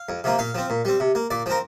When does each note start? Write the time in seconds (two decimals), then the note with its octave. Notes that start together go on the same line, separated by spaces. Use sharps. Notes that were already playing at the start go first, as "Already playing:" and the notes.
Already playing: F5
0.09 F2
0.24 C3 F3 A#3
0.39 A#2 F5
0.55 F3 C4
0.70 A#2
0.85 G3 C4
1.00 C3
1.15 A#3
1.31 A#2 D5
1.46 F3 C4 A#4